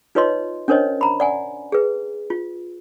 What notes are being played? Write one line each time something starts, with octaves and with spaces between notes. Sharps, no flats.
D#4 F4 B4 C#5 D#5 C6
C#4 D4 A#4 C5 C#5 D#5
A#5 B5
D5 F#5 G#5
G#4 B4
F4